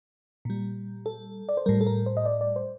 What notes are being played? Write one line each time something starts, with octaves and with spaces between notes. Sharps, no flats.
A#2 G3
A4
D5
C5
A2 G3 A#4
A4
A#4
C5
D#5
D5
D5
C5